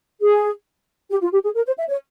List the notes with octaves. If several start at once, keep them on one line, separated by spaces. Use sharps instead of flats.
G#4
G4
F4
G4
G#4
A#4
C5
E5
C#5